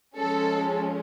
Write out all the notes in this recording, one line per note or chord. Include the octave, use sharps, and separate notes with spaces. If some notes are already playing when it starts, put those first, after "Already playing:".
F3 G#3 C#4 A4